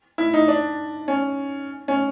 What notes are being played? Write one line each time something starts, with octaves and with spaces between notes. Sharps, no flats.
E4
D#4
D4
C#4
C#4